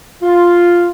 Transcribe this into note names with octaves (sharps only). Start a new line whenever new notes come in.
F4